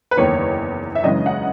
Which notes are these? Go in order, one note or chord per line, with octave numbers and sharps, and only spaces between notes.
B4
F#1 E2 D#3 C#5
E5
F#2 C#3 E3 G#3 D#5
F#5